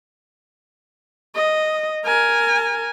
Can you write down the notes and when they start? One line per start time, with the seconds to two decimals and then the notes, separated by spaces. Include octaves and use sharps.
1.35 D#5
2.05 A#4 G#5